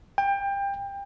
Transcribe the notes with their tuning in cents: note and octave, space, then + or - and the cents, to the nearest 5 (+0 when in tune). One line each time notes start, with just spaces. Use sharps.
G5 +25